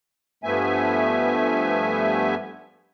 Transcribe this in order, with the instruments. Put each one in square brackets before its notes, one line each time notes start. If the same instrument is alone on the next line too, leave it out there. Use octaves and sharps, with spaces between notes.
[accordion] G2 F3 A3 B3 E5 G#5